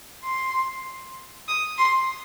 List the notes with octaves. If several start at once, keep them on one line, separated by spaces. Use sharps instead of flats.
C6
D#6
C6